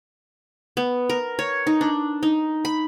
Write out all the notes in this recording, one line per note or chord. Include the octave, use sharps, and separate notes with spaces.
B3
A#4
C#5
D#4
D4
D#4
B5